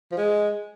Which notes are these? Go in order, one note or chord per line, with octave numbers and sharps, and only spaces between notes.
F3
G#3